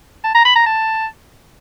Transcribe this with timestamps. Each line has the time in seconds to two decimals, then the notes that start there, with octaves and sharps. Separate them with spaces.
0.24 A5
0.35 A#5
0.45 B5
0.56 A#5
0.66 A5